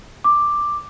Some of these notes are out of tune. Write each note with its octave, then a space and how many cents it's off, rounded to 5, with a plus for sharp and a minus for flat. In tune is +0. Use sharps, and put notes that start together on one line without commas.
D6 +5